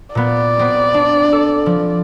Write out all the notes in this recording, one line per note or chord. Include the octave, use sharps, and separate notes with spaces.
A#2 B3 D5
B3 C4
D4
A4
F3